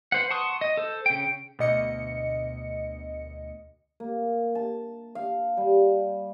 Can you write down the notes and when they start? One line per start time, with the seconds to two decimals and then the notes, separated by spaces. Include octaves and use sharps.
0.12 B4 C5 F#5
0.30 F#5 A5 C6 C#6 D#6
0.61 D#5
0.77 A4 C5
1.06 C#3 G5
1.59 D2 B2 D#5 C#7
4.00 A#3
4.55 A5
5.15 F5
5.57 G3